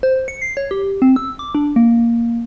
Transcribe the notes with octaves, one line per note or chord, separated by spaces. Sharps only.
C5
C#7
C7
C#5
G4
C4
E6
D6
D4
A#3